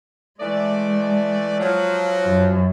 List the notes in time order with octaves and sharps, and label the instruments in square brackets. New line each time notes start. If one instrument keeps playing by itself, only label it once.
[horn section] E3 A3 D5 [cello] G#3
[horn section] F3 F#3
[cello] F#2